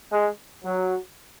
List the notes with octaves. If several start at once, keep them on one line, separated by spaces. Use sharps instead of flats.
G#3
F#3